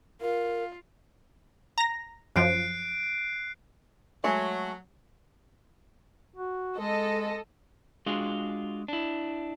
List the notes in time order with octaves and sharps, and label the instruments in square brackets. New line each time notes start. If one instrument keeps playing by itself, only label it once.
[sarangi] F4 [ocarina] A#4
[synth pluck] A#5 A#6
[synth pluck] F#2 F3 [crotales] F#6 C7 D7
[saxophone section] F#3 [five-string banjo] G#3 A3
[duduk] F#4
[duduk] G#3 [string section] A4 D#5
[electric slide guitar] G#3 D4 F4 F#4 G#4
D4 E4